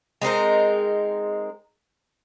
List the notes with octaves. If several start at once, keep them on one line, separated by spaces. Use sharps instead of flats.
G#3 C4 D#4 A#4